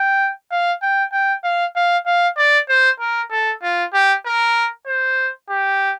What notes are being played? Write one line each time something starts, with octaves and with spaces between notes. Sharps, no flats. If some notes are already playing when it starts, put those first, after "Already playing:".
Already playing: G5
F5
G5
G5
F5
F5
F5
D5
C5
A#4
A4
F4
G4
A#4
C5
G4